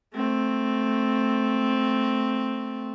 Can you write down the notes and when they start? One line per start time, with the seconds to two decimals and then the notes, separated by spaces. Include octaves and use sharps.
0.15 A3 C4